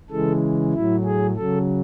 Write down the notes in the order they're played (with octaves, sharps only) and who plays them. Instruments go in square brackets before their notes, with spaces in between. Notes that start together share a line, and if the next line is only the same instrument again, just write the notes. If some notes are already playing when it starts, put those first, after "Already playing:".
[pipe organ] C#3 E3 G#3 A4
A2 F#3 E4
G#4
C#3 F#3 A4